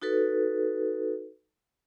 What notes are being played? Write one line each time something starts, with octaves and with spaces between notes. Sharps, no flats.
D#4 F#4 A4 B4